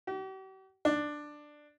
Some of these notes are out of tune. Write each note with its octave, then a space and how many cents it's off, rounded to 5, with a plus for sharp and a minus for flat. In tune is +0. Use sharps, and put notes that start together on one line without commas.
G4 -45
D4 +10